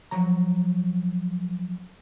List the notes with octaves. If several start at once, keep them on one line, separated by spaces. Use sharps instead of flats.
F3 F#3 A#5